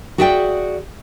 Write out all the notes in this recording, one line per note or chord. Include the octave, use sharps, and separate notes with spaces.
F#4 G#4 D5 E5 F5 G5